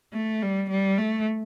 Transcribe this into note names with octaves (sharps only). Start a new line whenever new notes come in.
A3
G3
G3
A3